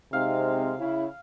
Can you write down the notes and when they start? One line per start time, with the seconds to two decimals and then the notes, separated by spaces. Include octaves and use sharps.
0.13 C3 G#3 C4 D#4 F5
0.78 C#3 E4